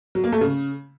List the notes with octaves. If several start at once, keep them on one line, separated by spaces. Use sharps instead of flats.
F#3
A#3
A3
C#3